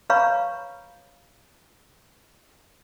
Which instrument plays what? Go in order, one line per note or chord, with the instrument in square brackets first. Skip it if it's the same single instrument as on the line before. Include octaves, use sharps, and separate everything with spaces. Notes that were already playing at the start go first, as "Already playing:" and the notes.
[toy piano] B4 C#5 F5 A#5 B5 C#6